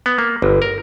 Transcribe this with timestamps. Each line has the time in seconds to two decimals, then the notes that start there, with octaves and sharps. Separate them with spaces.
0.06 B3
0.18 A#3
0.42 G1
0.62 A#4